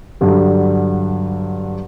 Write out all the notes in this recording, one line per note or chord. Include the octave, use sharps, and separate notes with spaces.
G2 D3 F#3